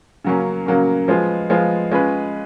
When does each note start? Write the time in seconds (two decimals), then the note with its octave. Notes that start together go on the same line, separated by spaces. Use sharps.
0.25 C#3 F#3 A#3 C#4
0.66 C#3 F#3 A#3 C#4
1.08 F3 G#3 B3 F4
1.50 F3 G#3 B3 F4
1.92 G#3 C#4 F4 B4